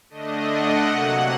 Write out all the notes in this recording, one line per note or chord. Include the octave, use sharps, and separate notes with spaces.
D3 A3 D4 D#5
F#5
C3 F#3 A#3 F#5